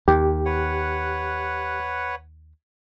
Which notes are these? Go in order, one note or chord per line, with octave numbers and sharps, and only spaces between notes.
D#2 G4
B4 C#5 F#5